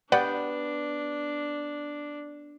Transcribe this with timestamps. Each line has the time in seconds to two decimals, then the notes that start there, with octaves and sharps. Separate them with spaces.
0.12 B3 D4 G4 B4 D5 F#5 G5